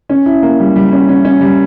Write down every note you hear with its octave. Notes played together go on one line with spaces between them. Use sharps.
C#4
E4
A#3
G3
G3
C#4
C#4
C#4
G3